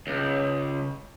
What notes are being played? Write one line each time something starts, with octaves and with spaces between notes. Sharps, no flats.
C#2